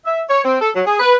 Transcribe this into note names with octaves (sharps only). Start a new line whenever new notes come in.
E5
C#5
C4
A4
F#3
G#4
B4